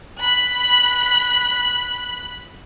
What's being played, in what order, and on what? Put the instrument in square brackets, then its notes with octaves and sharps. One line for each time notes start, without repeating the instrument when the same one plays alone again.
[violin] B5 F#6